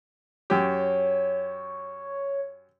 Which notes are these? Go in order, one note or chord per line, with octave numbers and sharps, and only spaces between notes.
F#2 G4 C#5